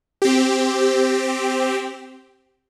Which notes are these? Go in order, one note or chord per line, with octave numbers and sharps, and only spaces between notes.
C4 G4